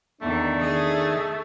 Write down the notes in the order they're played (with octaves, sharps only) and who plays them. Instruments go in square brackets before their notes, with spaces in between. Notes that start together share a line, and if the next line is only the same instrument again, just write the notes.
[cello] E2 D#3 [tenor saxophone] A3 [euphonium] D4
[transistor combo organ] D#3 [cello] G#4